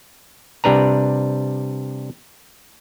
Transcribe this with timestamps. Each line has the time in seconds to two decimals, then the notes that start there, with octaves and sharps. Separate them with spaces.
0.64 C3 G3 D4 B4 A#5